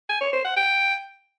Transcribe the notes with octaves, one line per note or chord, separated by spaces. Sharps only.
G#5
C#5
C5
F#5
G5